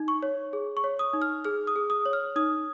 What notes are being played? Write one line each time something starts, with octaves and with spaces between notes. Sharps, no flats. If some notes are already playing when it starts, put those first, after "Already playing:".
Already playing: D#4
C#6
C#5
G#4
C#6
C#5
D#6
D#4
F6
G#4 F6
D#6
G#4
D#6
C#5
F6
D#4 D#6